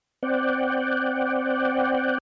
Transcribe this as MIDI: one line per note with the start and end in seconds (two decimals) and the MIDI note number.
0.23 2.18 60
0.23 2.18 74
0.23 2.18 78
0.23 2.18 79